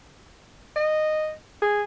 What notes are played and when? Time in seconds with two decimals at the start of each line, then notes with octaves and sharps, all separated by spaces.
0.76 D#5
1.62 G#4